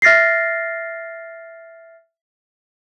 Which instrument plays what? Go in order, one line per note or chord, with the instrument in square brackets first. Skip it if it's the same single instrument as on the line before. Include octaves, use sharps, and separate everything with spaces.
[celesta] E5 F6 A6 A#6 C7